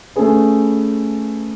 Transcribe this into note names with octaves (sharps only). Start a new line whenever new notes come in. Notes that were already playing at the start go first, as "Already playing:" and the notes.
A3 C#4 G#4 B4